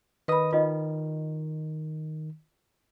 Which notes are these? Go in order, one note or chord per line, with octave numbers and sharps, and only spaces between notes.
D#3 B4 D#5 B5 D#6
D#3 F4 D#5